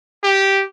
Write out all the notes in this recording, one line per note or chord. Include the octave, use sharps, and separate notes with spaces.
G4